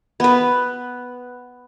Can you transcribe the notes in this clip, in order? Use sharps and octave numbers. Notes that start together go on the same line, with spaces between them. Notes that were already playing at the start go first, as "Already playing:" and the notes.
B3 B4